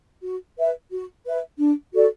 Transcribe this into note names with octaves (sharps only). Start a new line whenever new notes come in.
F#4
B4 E5
F#4
B4 E5
D4
F#4 A4 D5